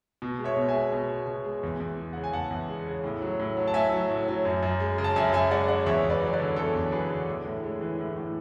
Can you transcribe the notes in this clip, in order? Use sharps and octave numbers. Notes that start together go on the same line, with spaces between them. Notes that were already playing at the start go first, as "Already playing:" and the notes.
B2
G#3
C#5 E5
B2
E5 G#5
G#3
B2
G#3
B2
G#3
E2
E2
G#3
C#3 F#5
G#5
E2 F#5 A5
E2
G#3
C#3
A2
F#3
A2
F#3
A5
A2 E5 G#5
F#3
A2
F#3
F#2
F#2
G#3
C#3
A5
F#2 E5 G#5
F#2 E5 G#5
G#3 D5 F#5
C#3 D5 F#5
E2 C#5 E5
E2
B4 D5
F#3
B4 D5
D3
E2 A4 C#5
E2
F#3 G#4 B4
D3
A2
A2
G#3
E3
A2
A2